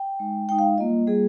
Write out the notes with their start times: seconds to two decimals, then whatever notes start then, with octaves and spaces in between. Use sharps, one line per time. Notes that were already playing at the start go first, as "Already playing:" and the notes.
Already playing: G5
0.19 G#3 D#4
0.49 G#3 D#4 G5
0.59 F5
0.78 G3 A#3 F4 D#5
1.07 G3 A#3 F4 G#4